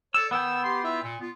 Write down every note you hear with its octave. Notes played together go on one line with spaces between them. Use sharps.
A4 C#5 D5 E6
D#3 B3 G5 E6
G4 C6
E4 F4 E5
A#2
B3 F4